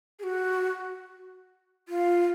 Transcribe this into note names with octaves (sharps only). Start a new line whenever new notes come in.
G#4
F#4
F4